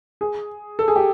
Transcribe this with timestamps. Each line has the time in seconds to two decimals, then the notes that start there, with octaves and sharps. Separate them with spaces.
0.21 G#4
0.79 A4
0.88 G#4
0.96 G4